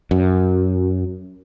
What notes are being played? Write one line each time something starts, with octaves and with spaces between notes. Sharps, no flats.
F#2